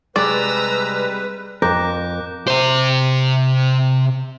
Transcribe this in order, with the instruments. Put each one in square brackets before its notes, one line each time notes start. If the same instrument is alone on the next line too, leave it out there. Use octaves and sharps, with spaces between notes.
[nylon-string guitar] C3 G#3 [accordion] G3 B4 [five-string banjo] D5 [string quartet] A#5 E6
[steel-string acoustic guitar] F2 [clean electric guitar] A#4 [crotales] D6 F#6 G6
[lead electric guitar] C3 C5